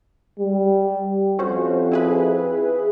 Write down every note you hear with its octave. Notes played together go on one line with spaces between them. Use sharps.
G3
F2 C#4 F#4 C5
E4 G#4 B4